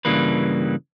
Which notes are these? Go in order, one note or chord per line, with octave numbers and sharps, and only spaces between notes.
G2 C#3 E3 G3 A#3 B4